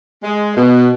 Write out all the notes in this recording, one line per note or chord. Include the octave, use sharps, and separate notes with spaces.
G#3
B2